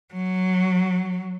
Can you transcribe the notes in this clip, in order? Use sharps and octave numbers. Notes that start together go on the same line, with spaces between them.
F#3